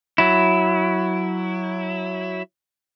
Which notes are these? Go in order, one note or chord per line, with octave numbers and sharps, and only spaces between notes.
F#3 E4